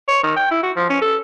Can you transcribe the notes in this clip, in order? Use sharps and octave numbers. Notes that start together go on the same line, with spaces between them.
C#5
D#3
G5
E4
F#4
F3
C#4
A4